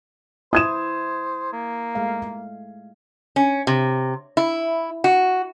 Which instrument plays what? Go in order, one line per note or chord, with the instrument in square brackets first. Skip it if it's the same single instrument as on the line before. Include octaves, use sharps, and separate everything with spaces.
[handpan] E4 [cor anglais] C5 [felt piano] D#6 G#6 E7
[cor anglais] A#3
[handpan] G#3 A3 F5
[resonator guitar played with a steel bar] C#4
C3
E4
F#4